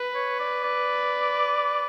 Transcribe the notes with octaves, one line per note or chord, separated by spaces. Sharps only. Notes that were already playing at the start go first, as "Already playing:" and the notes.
Already playing: B4
C#5
D5
D5